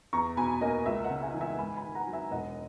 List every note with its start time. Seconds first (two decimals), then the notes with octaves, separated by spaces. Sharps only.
0.13 E2 A#5 C#6
0.37 B2 G#5 B5
0.61 A#3 D#5
0.86 C#2 E5
1.04 D#5 F#5
1.10 C#3
1.22 E5 G#5
1.34 E3
1.41 E5 G#5
1.58 G#2 G#5 B5
1.77 G#5 B5
1.83 D#3
1.95 F#5 A#5
2.07 F#3
2.13 E5 G#5
2.32 E1 D#5 F#5